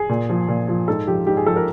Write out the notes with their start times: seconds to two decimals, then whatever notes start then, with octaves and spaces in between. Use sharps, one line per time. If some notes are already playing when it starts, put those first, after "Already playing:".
Already playing: G#4
0.09 A#2
0.29 F3
0.48 A#2
0.68 F3
0.88 G#2 A4
1.07 F3 G4
1.26 G#2 G4
1.37 G#4
1.46 F3 A4
1.56 A#4